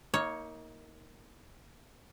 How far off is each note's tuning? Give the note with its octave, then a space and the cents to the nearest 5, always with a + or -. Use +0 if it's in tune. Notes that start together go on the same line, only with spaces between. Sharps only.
A#3 +0 D#4 +30 C#5 +0